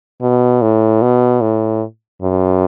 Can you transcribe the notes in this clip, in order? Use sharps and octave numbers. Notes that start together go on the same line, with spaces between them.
B2
A2
B2
A2
F#2